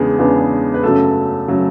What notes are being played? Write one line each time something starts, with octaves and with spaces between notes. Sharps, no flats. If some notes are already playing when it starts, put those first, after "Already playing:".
Already playing: E2 C#3 G#3 B3 D4 G#4
E2 C#3 G#3 B3 D4
B4
F#2 C#3 F#3 A3 A4
C#3 F#3 A3